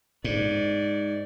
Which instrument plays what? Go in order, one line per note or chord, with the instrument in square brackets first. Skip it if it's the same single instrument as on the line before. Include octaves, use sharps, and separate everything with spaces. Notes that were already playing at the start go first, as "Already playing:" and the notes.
[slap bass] G#2 [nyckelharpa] D5